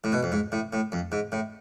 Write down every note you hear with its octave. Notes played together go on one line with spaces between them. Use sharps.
A2
B2
F2
G#2
A2
A2
F2
G#2
A2